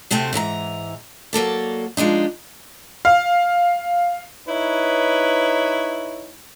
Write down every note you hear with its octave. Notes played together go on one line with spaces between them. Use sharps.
D2 C3 A3 C4 G#5
G#2 E3 A#4 A#5
F#3 A#3 A4 D5
F3 G#3 D4 D#4
F5
D#4 E4 B4 C#5